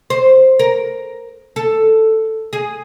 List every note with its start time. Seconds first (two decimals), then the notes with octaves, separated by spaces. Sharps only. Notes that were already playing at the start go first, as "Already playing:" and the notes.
0.10 C5
0.59 A#4
1.56 A4
2.53 G#4